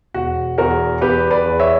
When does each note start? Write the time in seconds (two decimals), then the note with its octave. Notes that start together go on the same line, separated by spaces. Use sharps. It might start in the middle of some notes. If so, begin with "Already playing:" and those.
0.14 E1 F#4
0.58 E2 F#4 A#4
1.01 E2 G4 B4
1.31 B4 D5
1.45 E2
1.60 C#5 E5